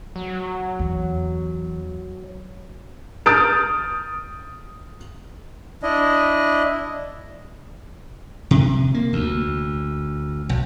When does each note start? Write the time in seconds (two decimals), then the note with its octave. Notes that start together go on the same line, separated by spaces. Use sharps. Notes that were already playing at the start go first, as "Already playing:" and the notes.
0.16 F#3
0.79 E2
3.26 D#6 F6 G6 A6 D7
5.83 D4 E4 D#5
8.51 C3
8.94 A#3
9.13 D2
10.49 B1